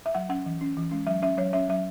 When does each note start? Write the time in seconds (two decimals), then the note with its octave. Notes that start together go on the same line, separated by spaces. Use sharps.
0.06 E5
0.15 F#3 F#5
0.29 C#4 F#5
0.46 E3
0.61 C#4
0.77 E3
0.91 G#3 C#4
1.07 F#3 E5
1.22 C#4 E5
1.38 F#3 C#5
1.53 C#4 E5
1.69 F#3 E5